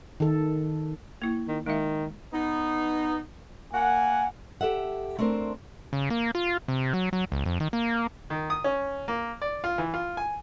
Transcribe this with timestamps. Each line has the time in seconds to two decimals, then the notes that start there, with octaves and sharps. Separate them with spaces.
0.20 D#3 A4
1.22 A#3 E4
1.48 D#3
1.66 D#3 G#3 E5
2.33 B3 D#4
3.73 A#3 F#5 G#5
4.61 G4 A4 E5 F#5
5.19 A3 C4 D4 A#4 C5
5.93 C#3
6.10 A#3
6.35 F4
6.68 C3
6.94 F#3
7.13 F#3
7.32 C#2
7.46 F2
7.60 D#3
7.73 A#3
8.30 D#3
8.50 D#6
8.64 C#4
9.08 A#3
9.42 D5
9.64 F4
9.78 E3
9.94 F4
10.17 G#5